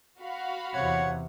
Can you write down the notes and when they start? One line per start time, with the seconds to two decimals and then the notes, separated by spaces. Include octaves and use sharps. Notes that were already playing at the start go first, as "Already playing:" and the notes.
0.21 F#4 F5 B5
0.74 E2 C3 C#5 F#5